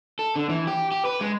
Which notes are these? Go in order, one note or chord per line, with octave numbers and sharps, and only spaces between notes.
A4
D3
E3
G4
G4
B4
G#3